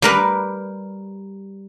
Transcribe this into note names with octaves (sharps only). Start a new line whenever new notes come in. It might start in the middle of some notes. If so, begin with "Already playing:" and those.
G3 A#4 B4